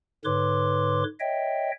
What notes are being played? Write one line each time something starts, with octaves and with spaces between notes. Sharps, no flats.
G#2 D3 B4 C#5 C6 D6
C#5 D#5 E5 G5